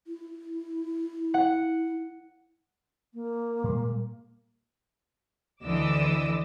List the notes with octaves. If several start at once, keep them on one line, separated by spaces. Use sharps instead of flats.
E4
F#5
A#3
A#2 G3 G#3
D2 D3 E3 D#5 D6 E6